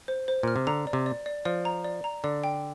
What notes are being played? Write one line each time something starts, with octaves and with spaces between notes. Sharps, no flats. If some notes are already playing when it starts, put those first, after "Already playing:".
C5
C5
A#2 F6
C3
D3 A#5
D5
C3
D5
D5
F3 D5
A#5
D5
A#5
D3 D5
G5